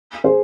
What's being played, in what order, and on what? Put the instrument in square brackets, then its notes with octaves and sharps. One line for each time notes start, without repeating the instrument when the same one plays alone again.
[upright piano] G#4 C5